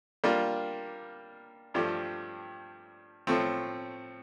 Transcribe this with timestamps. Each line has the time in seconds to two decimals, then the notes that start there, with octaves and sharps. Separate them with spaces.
0.24 G3 A#3 D4 F4
1.74 G2 F3 A3 D4 G4
3.27 A2 F3 A3 C4